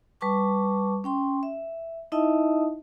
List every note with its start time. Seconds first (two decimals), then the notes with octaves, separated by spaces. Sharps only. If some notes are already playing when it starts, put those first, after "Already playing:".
0.21 G3 B4 A5 C#6 D6
1.04 C#4 G5 C6
1.43 E5
2.12 D#4 E4 D#5 E5 A5 D#6